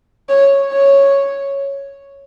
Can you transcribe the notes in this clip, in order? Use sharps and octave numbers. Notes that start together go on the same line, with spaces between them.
C#5
C#5